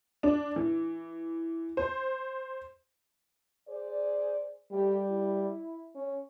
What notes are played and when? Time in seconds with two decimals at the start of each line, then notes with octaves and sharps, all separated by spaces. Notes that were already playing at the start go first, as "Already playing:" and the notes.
0.23 D4
0.56 E3
1.77 C5
3.68 G#4 C5 D5
4.72 G3 A3 G4
5.10 E4
5.95 C#4